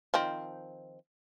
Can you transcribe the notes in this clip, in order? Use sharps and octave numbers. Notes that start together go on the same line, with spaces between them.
D#3 F3 C4